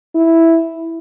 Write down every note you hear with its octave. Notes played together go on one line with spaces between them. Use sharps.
E4